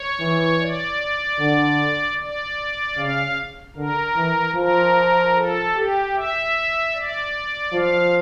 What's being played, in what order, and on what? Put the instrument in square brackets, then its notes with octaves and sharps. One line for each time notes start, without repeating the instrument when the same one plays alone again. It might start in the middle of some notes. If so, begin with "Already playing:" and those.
Already playing: [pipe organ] C#5
[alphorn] E3
[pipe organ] D5
[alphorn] D3
[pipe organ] D5
[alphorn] C#3 [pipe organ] F5
[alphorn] D3 [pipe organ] A#4
[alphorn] E3
[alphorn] F3 [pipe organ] A#4
[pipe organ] A4
G4
E5
D5
[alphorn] F3 [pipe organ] F5